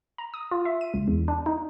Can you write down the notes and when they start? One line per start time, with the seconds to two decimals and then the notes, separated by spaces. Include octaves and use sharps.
0.18 A#5
0.34 D#6
0.51 F4
0.65 E5
0.81 D#7
0.94 C#2
1.08 E2
1.28 D4
1.46 D#4